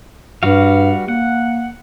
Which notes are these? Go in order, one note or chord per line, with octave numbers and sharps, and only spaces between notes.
G2 G3 F#4 F5
A#3 F#5